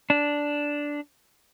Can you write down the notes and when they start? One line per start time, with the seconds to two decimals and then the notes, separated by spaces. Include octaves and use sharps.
0.10 D4